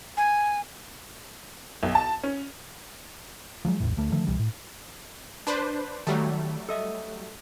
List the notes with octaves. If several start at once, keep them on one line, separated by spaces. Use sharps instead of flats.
G#5
B1
A5
C#4
F3 F#3 G#3
A#1 E2 A2
D2 A3
D3 D#3 F3 A3
C2 B2 E3 G3
A2
D4 B4 C5
D#3 F#3 G3 A3
A4 D#5 E5